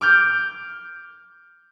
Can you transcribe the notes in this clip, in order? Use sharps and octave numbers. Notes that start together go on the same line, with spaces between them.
D6 F6 G6